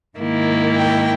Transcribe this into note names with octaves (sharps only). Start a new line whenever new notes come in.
G#2 D#3 A#3 E4
G5